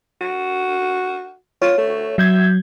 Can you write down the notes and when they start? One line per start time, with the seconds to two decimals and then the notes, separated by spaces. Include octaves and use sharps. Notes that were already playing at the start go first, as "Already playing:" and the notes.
0.21 F#4
1.62 F4 C#5
1.78 A3
2.18 F#3 E5 G6 G#6